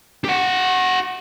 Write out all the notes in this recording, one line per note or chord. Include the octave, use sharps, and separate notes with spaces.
G4 F#5